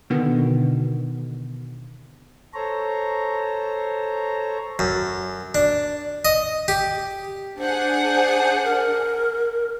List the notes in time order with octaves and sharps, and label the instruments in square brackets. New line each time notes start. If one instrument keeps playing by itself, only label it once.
[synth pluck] B2 D3 D#3 B3
[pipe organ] A4 C5 C#5 A#5
[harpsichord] F#2
D4
D#5
G4
[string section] D4 G#4 F#5 [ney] C5
[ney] A#4